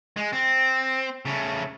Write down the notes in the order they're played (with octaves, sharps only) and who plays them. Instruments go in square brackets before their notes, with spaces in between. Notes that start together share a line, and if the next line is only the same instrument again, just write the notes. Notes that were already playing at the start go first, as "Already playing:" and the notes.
[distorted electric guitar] G#3
C4
C#3 A3